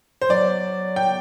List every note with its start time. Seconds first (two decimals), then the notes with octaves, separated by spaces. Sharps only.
0.22 C5
0.30 F#3 D5
0.96 G5